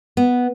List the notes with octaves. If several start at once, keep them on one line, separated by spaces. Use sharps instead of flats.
B3